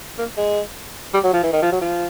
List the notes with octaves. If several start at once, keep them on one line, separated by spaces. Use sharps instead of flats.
A#3
G#3
G3
F#3
F3
E3
D#3
F3
F#3
F3